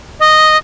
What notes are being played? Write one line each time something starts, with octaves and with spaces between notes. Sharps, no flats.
D#5